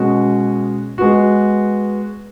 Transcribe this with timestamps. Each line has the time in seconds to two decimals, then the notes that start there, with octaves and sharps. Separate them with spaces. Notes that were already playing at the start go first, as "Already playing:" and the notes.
Already playing: B2 G#3 C#4 F#4
0.98 G#3 B3 F#4